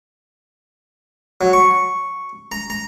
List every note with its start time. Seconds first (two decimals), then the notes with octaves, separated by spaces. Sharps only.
1.41 F#3
1.53 C#6
2.52 A#5
2.70 A#5